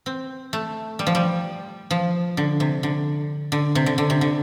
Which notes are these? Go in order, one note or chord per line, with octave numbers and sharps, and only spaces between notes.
C4
A3
G3
F3
G3
F3
D3
C3
D3
D3
C3
D3
D3
C3
D3